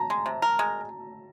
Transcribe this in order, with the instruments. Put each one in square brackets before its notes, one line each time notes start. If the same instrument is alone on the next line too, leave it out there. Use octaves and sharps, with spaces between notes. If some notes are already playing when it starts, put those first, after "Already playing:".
Already playing: [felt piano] A5 A#5
[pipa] G#3
C3
A#4
G#3